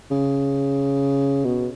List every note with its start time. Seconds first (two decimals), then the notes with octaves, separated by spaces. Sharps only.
0.11 C#3
1.45 B2